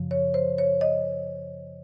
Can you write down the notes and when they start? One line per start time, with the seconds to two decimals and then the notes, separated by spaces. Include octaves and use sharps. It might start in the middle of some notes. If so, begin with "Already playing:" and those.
Already playing: F#2 C#3 F3
0.11 C#5
0.34 C5
0.58 C#5
0.81 D#5